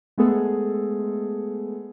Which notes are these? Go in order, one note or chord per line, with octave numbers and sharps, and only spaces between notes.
G#3 A3 B3 G#4 A4